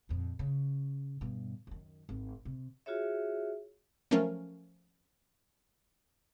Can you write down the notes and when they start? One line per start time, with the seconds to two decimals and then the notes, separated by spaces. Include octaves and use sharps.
0.09 A#1 F2
0.39 C#3
1.21 G2 B2
1.67 F#2 D#3
2.09 G#1
2.45 C3
2.86 F4 F#4 G#4 C#5 E5
4.11 F3 F#3 A3 C#4 A#4